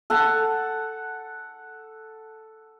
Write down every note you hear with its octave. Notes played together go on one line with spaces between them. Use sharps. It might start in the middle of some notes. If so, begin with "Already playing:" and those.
A4 F#5 A5